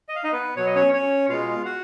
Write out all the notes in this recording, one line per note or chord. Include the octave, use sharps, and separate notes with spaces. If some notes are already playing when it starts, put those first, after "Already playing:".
D#5
F5
D#4 D#5
B3 B4
B2 F#3 C#5
D#5
C#4 C#5
C#4 C#5
B2 G#3 F4 F5
F#4 F#5